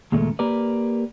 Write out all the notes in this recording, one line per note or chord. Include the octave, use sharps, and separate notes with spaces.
D#2 A#2 C#3 G#3 A3
A#3 G4 A#4 B4 D5